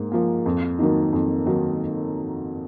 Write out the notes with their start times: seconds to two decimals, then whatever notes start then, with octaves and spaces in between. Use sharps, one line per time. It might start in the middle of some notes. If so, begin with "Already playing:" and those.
Already playing: G#2 A#3
0.12 F3 A#3
0.46 F2
0.79 D#3 F#3 A#3 D#4
1.13 F2
1.46 D#3 F#3 A#3 D#4